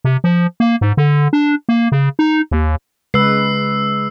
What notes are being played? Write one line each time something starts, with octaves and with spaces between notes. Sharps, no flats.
C3
F3
A#3
G#2
D3
D4
A#3
C#3
D#4
D#2
C#3 G#3 B4 E6 C7